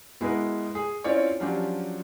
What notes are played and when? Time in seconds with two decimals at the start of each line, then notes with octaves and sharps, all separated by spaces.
0.21 B2 G#3 E4 F#4 A#4 B4
0.75 G#4
1.04 C4 C#4 E4 F4 C#5 D5
1.40 F3 F#3 C#4 D4 F4 G4